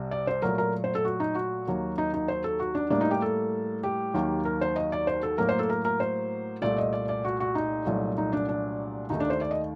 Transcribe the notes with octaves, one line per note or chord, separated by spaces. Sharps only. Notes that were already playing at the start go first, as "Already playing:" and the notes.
Already playing: C2 C3 G3
D5
C5
A#2 F#3 A3 A#4
A#4
C5
A4
F#4
D#4
F#4
D#2 D#3 F#3 A#3
D#4
D#4
C5
A4
F#4
D4
A2 G3 A#3 D4
D#4
G4
A4
G4
D#2 D#3 F#3 A#3
A#4
C5
D#5
D5
C5
A4
A2 F#3 A#3 A#4
C5
A4
A#4
A#4
C5
C2 A#2 A3 D5
D#5
D5
D5
F#4
F#4
D#4
C2 A#2 F#3 A3
D#4
D4
D4
D#2 D#3 A3 D#4
D4
C5
D5
D#5